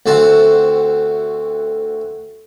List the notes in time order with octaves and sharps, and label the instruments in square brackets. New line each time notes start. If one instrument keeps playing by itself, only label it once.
[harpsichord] D2 A3 C4 F#4 A5